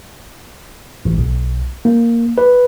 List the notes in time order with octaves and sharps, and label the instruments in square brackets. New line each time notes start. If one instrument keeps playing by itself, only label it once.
[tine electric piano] A1
B1
A#3
B4